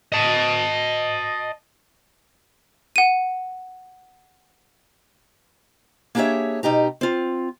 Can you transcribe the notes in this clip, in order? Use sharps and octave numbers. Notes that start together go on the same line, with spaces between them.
D#5 A5
F#5 D#7
A#3 D4 G4 G#4 C#5 E5
B2 D#4 G4 A#5
C4 F4